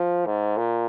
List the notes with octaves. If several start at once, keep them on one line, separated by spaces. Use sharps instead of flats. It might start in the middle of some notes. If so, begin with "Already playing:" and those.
Already playing: F3
G#2
A#2